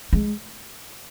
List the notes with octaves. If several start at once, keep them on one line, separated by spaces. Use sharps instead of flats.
G#3